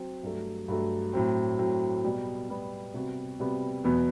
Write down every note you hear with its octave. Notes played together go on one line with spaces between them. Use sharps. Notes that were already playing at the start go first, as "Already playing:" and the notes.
Already playing: F#3 C4
G2 F#3 A3
G2 F#3 A3
A2 F#3 C4
A2 F#3 C4
B2 G3 B3
B2 G3 B3
C3 G3 B3 F#4
C3 G3 B3 F#4
E2 B2 F#3 B3